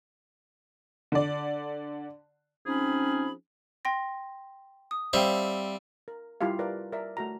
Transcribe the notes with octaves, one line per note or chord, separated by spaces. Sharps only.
D3 D5
F3 C4 C#4 D#4 G#4 B5
G5 C6 A#6
D#6
G3 C4 C5 E5 F5 G5
A#4
G3 E4 F4 G4 F5
A#4 B4 D5
A#4 D5 E5
A3 F#4 A#5